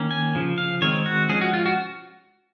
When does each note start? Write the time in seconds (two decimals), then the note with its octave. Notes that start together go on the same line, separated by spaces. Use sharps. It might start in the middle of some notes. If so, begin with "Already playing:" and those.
Already playing: D#3 A#3 C#4
0.11 G#5
0.35 C#3 F3
0.58 F5
0.82 D#3 G#3 C4 C#5
1.06 F#4
1.29 F3 G#3 C#4 G#4
1.41 F#4
1.54 F4
1.66 F#4